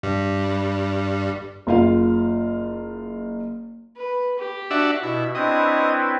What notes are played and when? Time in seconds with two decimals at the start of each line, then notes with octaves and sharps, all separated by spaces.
0.03 G2 G3
1.67 F#1 F4 F5
3.96 B4
4.39 G4
4.70 D4 F#4 E5
5.03 B2 E4
5.35 C4 D4 E4 B4 C#5 D#5